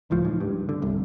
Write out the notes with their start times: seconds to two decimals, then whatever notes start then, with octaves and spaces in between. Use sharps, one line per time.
0.10 G#1 C#2 A2 F3
0.25 G#2
0.40 G2
0.69 D3
0.82 G1 C2